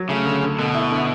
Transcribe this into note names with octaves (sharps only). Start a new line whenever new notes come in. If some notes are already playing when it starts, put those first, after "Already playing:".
Already playing: F#3
C#3 A3
D3
D3
B2 D3
E4
D3